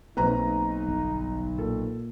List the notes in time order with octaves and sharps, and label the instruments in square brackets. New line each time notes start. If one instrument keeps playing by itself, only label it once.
[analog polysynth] B1 [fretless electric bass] A#3 C4 [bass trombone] D#4 [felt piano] B4 A#5
[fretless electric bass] G1
[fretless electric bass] A#2 [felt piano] A4